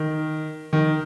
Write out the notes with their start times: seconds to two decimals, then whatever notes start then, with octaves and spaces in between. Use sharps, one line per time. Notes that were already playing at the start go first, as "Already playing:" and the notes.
Already playing: D#3
0.73 D#3